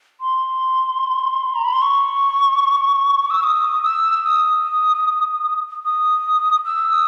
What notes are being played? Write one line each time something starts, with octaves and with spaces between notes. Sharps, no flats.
C6
A#5
B5
C6
C#6
E6
D#6
E6
D#6
D#6
E6
D#6